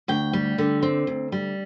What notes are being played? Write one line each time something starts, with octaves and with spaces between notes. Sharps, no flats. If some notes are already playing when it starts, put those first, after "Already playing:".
D2 G5
G3
D3
C4
D2
G3